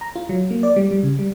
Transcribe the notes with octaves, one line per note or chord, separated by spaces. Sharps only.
A#5
F4
F#3
A#3
D5
G3
G3
C#3
G3